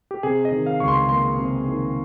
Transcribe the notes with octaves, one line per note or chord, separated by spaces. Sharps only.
G4
C3 G#4
D#5
D#3
F5
C#2 C#6
C6
A#3 C6
C3
D#3